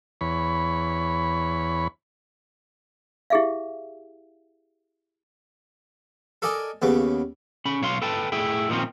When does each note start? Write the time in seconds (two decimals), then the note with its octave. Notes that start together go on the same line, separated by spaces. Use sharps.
0.21 E2 C#5 B5
3.30 E4 G4 G#4 E5 F5
6.42 A4 A#4 D5 D#5 G#5
6.82 D#2 C#3 B3
7.65 C#4 B5
7.82 B1 C#5 F5 C6
8.02 A4 B4 G5 A5
8.32 A2 E4 G#4 G5
8.69 A#2 D#3 F3 G#3 C4 C#4